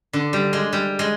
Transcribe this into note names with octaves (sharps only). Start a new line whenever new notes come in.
D3
G3
G#3
G3
G#3